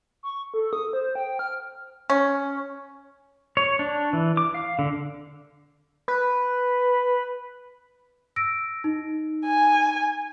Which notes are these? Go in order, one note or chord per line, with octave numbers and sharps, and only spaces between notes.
C#6
A4
D#6
C5
G5
F6
C#4
C#5
D4
E3
D6
F5
D3
B4
E6 A#6 D7
D#4
G#5